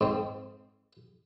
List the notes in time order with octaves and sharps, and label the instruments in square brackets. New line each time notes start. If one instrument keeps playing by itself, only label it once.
[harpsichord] G#2 C4